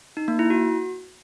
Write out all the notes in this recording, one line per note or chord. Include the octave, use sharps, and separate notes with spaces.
D#4
A#3
E4
F#4